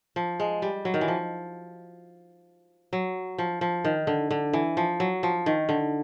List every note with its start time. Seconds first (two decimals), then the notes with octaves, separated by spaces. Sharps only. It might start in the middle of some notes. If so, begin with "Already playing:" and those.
0.16 F3
0.40 G#3
0.62 G3
0.85 F#3
0.94 D#3
1.01 E3
1.08 F3
2.93 F#3
3.38 F3
3.61 F3
3.85 D#3
4.07 D3
4.31 D3
4.53 E3
4.77 F3
5.00 F#3
5.23 F3
5.46 D#3
5.69 D3